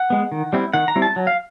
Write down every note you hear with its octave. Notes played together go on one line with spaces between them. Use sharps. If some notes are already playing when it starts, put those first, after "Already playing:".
Already playing: F#5
G#3 B3
D#3
G3 C4 E4
D#3 F#5
A#5
G3 C4 E4
A5
F#3
F5